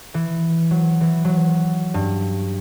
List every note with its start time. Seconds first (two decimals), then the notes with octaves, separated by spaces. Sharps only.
0.14 E3
0.71 F#3
1.01 E3
1.25 F#3
1.94 G2